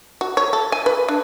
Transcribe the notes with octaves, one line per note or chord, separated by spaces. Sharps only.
F#4
C#5
A4
G#5
B4
D4